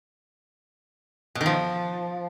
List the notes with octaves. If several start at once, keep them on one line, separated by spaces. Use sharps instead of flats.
B2
D#3
F3